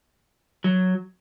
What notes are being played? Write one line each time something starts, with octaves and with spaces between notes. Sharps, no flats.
F#3